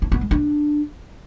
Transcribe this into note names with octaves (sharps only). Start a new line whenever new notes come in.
D4
B3
G#3
D4